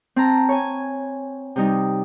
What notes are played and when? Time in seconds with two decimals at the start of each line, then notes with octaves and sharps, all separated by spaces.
0.16 C4 A5 A#5
0.49 C#5 G#5
1.56 C3 G3 D#4